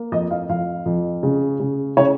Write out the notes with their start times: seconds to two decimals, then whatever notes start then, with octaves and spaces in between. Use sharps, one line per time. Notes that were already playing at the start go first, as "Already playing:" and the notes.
Already playing: A#3
0.12 F2 D#5
0.31 F5
0.49 F2 F5
0.86 F2
1.23 C#3
1.60 C#3
1.97 C#3 C#5